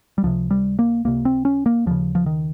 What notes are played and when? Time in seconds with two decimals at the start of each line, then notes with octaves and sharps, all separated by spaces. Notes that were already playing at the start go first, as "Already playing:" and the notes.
0.18 G3
0.23 C#2 C3 F3
0.51 G3
0.79 A#3
1.05 C#2 C3 A#3
1.25 C4
1.45 C#4
1.66 A#3
1.86 D#2 C#3 F3
2.15 F3
2.26 D#3